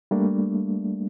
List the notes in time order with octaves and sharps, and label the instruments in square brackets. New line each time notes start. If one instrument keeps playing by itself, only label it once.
[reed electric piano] G3 A3 A#3 D4